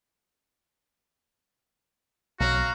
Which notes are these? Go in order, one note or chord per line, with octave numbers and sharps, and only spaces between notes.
B1 F#3 F#4 F5 A#5